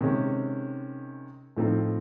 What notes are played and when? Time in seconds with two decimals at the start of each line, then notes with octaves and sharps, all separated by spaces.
0.01 C3 D#3 G#3 C#4
1.57 A2 F3 A3 C4 D#4